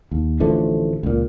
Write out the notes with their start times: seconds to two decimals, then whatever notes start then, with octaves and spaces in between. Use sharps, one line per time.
0.11 D#2
0.40 A1 D3 F3 A3
1.03 C#2 A#2